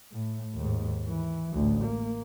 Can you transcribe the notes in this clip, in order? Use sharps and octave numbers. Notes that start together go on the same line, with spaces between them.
A2
D#2 G#2
E3
A1 D2
A#3